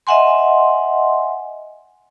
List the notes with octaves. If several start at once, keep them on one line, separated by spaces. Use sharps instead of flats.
D#5 E5 F#5 G#5 C6